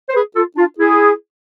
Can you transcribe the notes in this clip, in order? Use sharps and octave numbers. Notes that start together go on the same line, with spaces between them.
C5
G#4 B4
F4 A4
D4 F4
E4 G#4